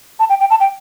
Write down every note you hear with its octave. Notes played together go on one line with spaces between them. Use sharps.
A5
G5
G5
A5
G5